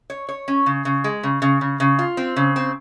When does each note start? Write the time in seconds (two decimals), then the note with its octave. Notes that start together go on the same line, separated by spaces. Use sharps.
0.10 C#5
0.29 C#5
0.48 C#4
0.66 C#3
0.85 C#3
1.04 G#3
1.23 C#3
1.42 C#3
1.61 C#3
1.80 C#3
1.99 F4
2.17 C4
2.36 C#3
2.56 C4